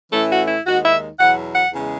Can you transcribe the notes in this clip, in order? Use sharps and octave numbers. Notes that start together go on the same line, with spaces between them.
A2 E3 A3 C#4 E4 A4
F#4
E4
D#2 D#3 G#3 D#4 F#4
E5
E2 B2 F#3 F#5
F#5
E2 C#3 G#3